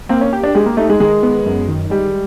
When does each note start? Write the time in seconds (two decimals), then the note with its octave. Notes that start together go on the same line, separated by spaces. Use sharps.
0.09 A#3 C4
0.21 C#4
0.33 G4
0.43 D4
0.55 G#3 G4
0.66 A#3
0.77 A3 D#4
0.89 G#3
1.00 D#3 G#3
1.23 B3
1.46 F#2
1.69 D#3
1.90 G3 G#3